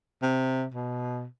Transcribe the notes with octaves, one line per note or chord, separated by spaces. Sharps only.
C3
B2